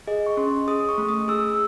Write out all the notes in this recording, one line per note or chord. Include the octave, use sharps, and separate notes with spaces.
G#4 D#5
C#6
C#4 C6
G#4 D#6
C#6
A3
D#6
G#4 E6